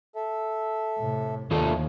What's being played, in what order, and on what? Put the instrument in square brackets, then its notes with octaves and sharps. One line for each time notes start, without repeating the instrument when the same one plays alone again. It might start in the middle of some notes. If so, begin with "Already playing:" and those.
[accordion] A4 E5
[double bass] A2 C3
[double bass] D#2 [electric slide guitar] D#3 F4 A4 [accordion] A3 D4